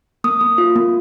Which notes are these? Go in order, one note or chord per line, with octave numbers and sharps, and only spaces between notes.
A#3 D#6
A#3
F4
A#3